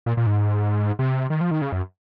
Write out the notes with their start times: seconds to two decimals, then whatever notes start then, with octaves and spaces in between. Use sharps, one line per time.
0.06 A#2
0.17 A#2
0.26 G#2
0.99 C3
1.30 D#3
1.41 F3
1.51 D#3
1.62 C#3
1.72 F#2